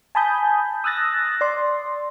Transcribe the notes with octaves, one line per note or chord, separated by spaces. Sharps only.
G#5 A5 B5 D#6 G6
D#6 E6 F#6 A6 A#6
D5 C6